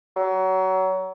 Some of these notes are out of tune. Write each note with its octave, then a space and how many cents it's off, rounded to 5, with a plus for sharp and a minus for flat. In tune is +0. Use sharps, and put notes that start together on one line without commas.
F#3 +25